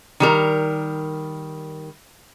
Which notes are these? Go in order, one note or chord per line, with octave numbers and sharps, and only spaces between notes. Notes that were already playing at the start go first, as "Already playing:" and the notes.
D#3 G3 A#4